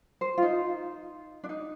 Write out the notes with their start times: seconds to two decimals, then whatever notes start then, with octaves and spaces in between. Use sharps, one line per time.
0.21 C5
0.38 F4
0.42 D#4
1.44 D4
1.49 D#4